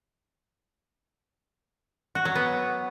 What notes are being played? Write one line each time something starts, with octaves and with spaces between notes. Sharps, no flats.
F#4
F#3
B3